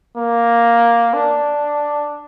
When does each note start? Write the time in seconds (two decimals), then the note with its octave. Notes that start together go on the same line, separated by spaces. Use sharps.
0.17 A#3
1.14 D4